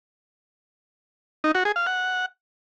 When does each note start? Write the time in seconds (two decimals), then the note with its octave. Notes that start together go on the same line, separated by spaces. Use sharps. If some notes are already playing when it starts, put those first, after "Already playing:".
1.44 D#4
1.55 F#4
1.65 G#4
1.76 F5
1.87 F#5